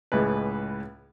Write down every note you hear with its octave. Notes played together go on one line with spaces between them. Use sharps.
C#2 A2 G#3 B4